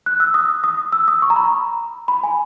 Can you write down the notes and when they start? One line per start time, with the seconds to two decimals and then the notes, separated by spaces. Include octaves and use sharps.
0.06 F#6
0.20 E6
0.34 D#6
0.64 D#6
0.92 E6
1.08 D#6
1.22 C#6
1.30 A#5
1.36 B5
2.08 B5
2.23 G#5